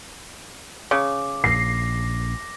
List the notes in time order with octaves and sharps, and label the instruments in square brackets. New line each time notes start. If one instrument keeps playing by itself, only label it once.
[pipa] C#3 [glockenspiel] D6
[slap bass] A#1 A#2 [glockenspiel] A#6 [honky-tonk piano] C7